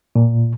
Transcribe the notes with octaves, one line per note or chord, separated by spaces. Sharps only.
A#2